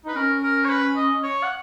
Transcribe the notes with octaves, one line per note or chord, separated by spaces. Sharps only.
D#4 B4
C#4 A#4
A#4
C#5
B4
D#5
C#5
F#5